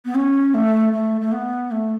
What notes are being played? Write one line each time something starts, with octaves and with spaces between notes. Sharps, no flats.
B3
C#4
A3
A3
A3
B3
A3